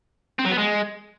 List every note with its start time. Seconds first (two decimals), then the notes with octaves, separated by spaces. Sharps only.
0.39 C4
0.45 F#3
0.52 B3
0.58 G#3